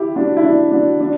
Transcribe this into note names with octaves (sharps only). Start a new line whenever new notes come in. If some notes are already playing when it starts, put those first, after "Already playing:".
Already playing: E4 G4
D4 F#4
E4
D4
D4 F#4
D4